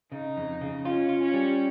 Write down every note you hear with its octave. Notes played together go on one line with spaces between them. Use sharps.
C#3 D#4
F2
C#3
C#4 F4
F4
C#4
G3